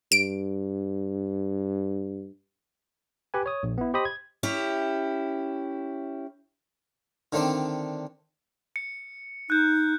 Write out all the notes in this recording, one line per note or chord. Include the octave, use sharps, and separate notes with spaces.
G2 D7
G4 B4 G#5
C#5 D#6
A#1
B3 E4
G4 C5 D#5 B5 D#6
G#6
C#4 E4 G4
D3 D#3 A3 C4 D4
C#7
D#4 F#6 G6